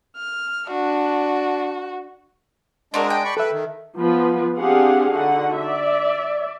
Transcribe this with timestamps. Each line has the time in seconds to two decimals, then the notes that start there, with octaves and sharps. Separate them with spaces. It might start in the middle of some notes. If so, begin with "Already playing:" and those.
0.17 F6
0.70 D4 F#4
2.94 G#3 C4 D4 F#4 A#4 D#5
3.10 G5
3.24 D5 B5 C#6
3.37 A4 B4 E5
3.52 D#3
3.98 F3 B3 B4
4.58 C4 D4 G4 G#4 F5 F#5
5.12 D3 D#4 F#4 F#5
5.58 D5 E5